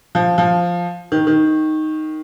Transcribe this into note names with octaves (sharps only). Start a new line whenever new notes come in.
F3
F3
D#3
D#3